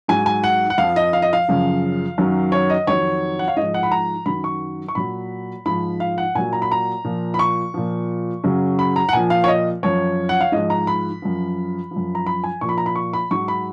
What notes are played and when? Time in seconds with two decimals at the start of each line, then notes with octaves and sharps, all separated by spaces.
0.08 G#2 F#3 G#5
0.26 G#5
0.44 F#5
0.70 F#5
0.78 F2 F3 F5
0.96 D#5
1.13 F5
1.22 D#5
1.33 F5
1.48 F#2 C#3 F3
2.18 F#2 D#3 F#3
2.52 C#5
2.70 D#5
2.87 F2 D#3 F#3 C#5
3.39 F#5
3.48 F5
3.56 G#2 F3 D#5
3.74 F#5
3.83 B5
3.91 A#5
4.26 F#2 D#3 F#3 B5
4.44 C#6
4.88 C#6
4.95 A#2 F#3 B5
5.65 G#2 F3 B5
6.00 F5
6.18 F#5
6.35 A#2 F#3 G#5
6.53 A#5
6.62 B5
6.71 A#5
7.04 A#2 F3
7.34 B5
7.39 C#6
7.74 A#2 F3
8.44 F#2 C#3 F#3
8.79 B5
8.96 A#5
9.09 F#5
9.13 A#2 F3 G#5
9.30 F5
9.44 C#5
9.48 D#5
9.83 F#2 F3 C#5
10.29 F#5
10.41 F5
10.52 G#2 F3 D#5
10.70 A#5
10.87 B5
11.22 F#2 F3
11.91 F3
11.96 F#2
12.15 A#5
12.26 B5
12.44 G#5
12.61 A#2 F3 C#6
12.69 B5
12.78 A#5
12.86 B5
12.95 C#6
13.13 B5
13.31 G#2 F#3 C#6
13.48 B5